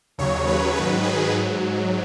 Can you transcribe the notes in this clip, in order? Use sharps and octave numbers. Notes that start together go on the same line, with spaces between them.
D#2 C#3 F#3 C#5
B4
G#2 D#3 F#3 B4
G#4
G#2 F#3